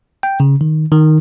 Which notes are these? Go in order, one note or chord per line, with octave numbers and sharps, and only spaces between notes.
G5
C#3
D#3
D#3